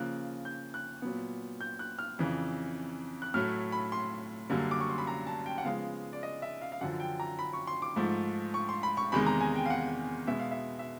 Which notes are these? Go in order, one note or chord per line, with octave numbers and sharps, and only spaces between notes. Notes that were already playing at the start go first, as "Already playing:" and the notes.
Already playing: C#3 F3 A#3 F#6
G6
F#6
A#2 F#3 B3
G6
F#6
F6
F2 C#3 E3
F#6
A2 F#3 A3 F6
B5
C6
F#2 D3 G3 A#3
D6
C#6
C6
B5
A#5
A5
G5
F#5
C#3 F3 G#3 B3 F5
D5
D#5
E5
F5
F5
F#2 D3 F3 F#5
G5
A#5
B5
C#6
C6
D6
G#2 F3 A3
C#6
C6
B5
C#6
E2 C3 D#3 G#3 B5
A#5
G#5
G5
F5
F#5
B2 G#3 B3 E5
F5
E5
E5